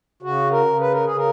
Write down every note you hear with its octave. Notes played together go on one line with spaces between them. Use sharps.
C#3 F#4
A#4
C#3
B4
A#4
C#3 G#4
A#4